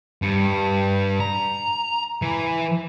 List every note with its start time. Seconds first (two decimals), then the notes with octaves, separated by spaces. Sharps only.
0.22 G2
1.20 A#5
2.22 E3